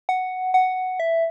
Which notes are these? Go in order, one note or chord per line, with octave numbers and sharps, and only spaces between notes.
F#5
F#5
E5